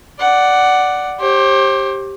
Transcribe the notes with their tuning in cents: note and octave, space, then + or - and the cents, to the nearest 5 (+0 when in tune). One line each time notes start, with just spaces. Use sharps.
D5 +0 F#5 +5
G4 +0 C5 +40